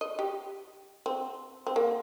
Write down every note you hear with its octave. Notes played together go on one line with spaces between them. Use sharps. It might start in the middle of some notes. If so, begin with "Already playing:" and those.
D#5
G4
C4
C4
A#3